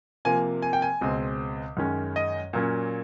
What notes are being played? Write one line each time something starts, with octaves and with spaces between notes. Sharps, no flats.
C3 F3 A#3 G#5
G#5
G5
G#5
C#2 B2 G#3 C4
F#2 D#3 G#3 C#4
D#5
A#2 F#3 A#3 C#4